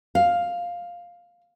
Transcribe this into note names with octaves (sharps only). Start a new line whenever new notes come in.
F5